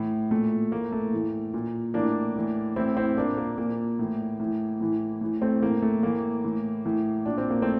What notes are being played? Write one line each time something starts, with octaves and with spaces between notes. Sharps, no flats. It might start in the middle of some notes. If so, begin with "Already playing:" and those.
Already playing: A2 E3
A#2 A3
A2 E3 A#3
A3
A2 E3
A#2
A2 E3 A#3 D4
A2 E3
A2 E3 C4 E4
C4 E4
A#2 A#3 D4
A#3
A#2 A#3
A2 E3
A2 E3
A2 E3
A2 E3
A3 C4
A2 E3 A#3
A3
A2 E3 A#3
A2 E3
A2 E3
A#2 D4
C4
A#3
A3 C4